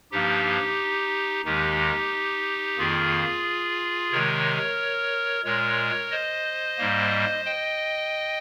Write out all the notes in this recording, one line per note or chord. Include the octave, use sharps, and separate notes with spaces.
G2 F3 A#3 D#4 G4
D#2 D#3 G#3 D#4 G4
F2 D#3 A#3 F4 G#4
C3 D#3 G#3 A#4 C#5
A#2 G#3 A#4 C#5
C5 D#5
G#2 G3 A#3
D#5 G5